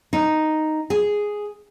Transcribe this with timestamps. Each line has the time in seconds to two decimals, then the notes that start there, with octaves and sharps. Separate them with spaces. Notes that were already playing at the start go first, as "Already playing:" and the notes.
0.13 D#4
0.90 G#4